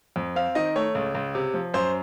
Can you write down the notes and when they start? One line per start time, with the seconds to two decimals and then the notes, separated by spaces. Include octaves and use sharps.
0.16 F2
0.36 C4 F5
0.55 D#3 D#5
0.76 A3 C#5
0.95 C#2
1.15 C#2
1.35 C3
1.54 F3
1.74 F#2 C5